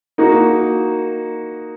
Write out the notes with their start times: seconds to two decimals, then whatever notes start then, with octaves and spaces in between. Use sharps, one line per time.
0.18 A#3 D#4 F#4